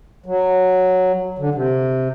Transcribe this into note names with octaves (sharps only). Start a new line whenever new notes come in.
F#3
D3
C3